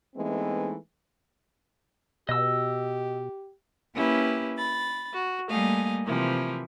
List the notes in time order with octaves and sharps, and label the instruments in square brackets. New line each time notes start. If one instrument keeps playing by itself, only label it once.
[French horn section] E3 G#3 A3 B3 C4 D#4
[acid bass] B2 [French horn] G4 [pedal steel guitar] D#5 E6
[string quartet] A#3 C#4 E4 G4 B4
B5 A6
F#4
G3 A3 A#3 D#5 F5 G#5
C3 E3 F3 A#3 E4